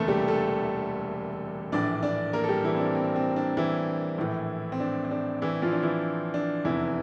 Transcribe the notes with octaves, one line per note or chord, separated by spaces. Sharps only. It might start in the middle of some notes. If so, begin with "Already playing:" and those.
Already playing: E1 D2 C3 E3 A3 A#3 A4
G3 G4
A3 A4
A#1 A2 E3 D4 D5
D4 D5
A#3 A#4
A4
G3 G4
E3 E4
C4
D4
C4
C4
D4
E3 E4
A#1 A2 E3
C4
D4
C4
D4
E3 E4
F3 F4
D4
E3 E4
D4
F1 E2 C3 E3 E4